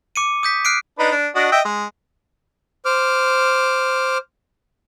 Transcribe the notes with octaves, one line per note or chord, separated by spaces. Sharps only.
D6 C#7 D#7
D#6 G6 B6
F6 F#6 C7 D7
D4 D#4 B4
D4
D4 F#4 D#5
D#5 E5 G5
G#3
C5 D6 F6